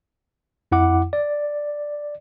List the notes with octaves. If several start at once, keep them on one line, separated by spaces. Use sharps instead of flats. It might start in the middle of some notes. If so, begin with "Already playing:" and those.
F2 E4 F#5 D6
D5